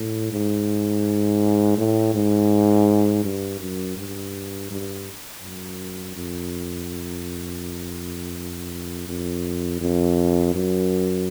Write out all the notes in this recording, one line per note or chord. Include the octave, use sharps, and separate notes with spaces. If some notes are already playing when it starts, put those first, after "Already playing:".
Already playing: A2
G#2
A2
G#2
G2
F#2
G2
G2
F#2
F2
F2
F2
F#2